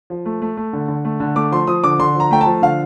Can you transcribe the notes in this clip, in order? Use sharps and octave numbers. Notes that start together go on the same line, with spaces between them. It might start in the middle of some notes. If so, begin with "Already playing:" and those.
F3
A3
A3
A3
D3
D3
A3
D3
A3 D6
F3 C6
F3 D#6
D3 D6
D3 C6
F3
A#5
A3 G5
A5
F3
D3 F5